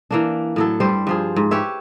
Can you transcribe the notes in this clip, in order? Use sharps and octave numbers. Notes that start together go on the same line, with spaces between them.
E3 A#3 D4
A2 F#3 A4
G2 G3 C5
G2 F3 G#4
G#2
G4 B4 C#5 E5